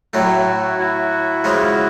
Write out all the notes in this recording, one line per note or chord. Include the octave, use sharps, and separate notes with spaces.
A2 F#3 A3 E4 F#4
E4 F#4
C#3 F3 G#3